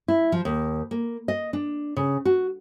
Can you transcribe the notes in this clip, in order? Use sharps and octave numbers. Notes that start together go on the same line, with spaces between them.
E4
F3
D#2
A#3
D#5
D4
C#3
F#4